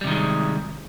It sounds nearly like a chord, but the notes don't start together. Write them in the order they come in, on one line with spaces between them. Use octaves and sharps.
G3 C3 D#3 G#3